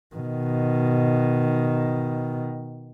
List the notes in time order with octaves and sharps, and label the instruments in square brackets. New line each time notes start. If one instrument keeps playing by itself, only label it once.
[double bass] B2 D#3